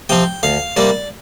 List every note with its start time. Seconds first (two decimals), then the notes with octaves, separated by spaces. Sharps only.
0.09 C3 F3 C4 G5
0.43 D2 F5
0.77 C3 G3 A#3 D5